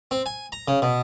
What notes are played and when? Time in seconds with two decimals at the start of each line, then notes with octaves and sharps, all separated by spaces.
0.11 C4
0.26 G#5
0.52 A#5
0.68 C#3
0.82 B2